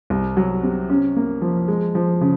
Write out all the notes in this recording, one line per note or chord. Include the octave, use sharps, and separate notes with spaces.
C2
F#3
C3
C#4
A#3
F3
G#3
F3
C#3